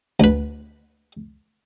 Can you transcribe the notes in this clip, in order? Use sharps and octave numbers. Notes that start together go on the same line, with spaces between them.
D2 B4